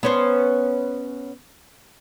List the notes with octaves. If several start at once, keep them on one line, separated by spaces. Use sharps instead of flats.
B3 C#4 C5